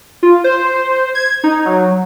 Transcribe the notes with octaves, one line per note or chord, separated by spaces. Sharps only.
F4
C5
G#6
D#4
F#3